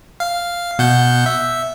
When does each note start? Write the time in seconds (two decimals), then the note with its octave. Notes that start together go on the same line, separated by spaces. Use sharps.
0.20 F5
0.79 B2 F#5 G6
1.26 E5